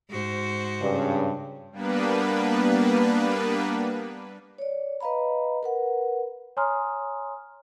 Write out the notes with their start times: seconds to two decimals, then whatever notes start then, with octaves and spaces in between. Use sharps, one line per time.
0.10 G#2 F#4 C5
0.81 G2 C#3
1.72 G3 A#3 B3 D4 B4
4.58 C#5 D5
5.01 B4 D#5 F5 A#5 B5
5.63 A#4 B4 F#5
6.57 C#5 G#5 A#5 C6 D#6 F6